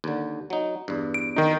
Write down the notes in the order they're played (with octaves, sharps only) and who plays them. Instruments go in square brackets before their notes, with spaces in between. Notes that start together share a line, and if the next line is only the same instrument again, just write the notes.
[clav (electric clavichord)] D#2 D3
F#3 D#4
E2 G2
[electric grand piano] D7
D#3 D#4